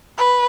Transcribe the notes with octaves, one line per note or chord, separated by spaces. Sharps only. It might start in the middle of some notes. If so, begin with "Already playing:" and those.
B4